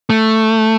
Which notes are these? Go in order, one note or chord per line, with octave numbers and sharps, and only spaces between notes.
A3